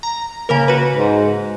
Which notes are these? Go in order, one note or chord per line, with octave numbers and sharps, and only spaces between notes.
A#5
C#3 A#3 A#4
F#4 B4
G#2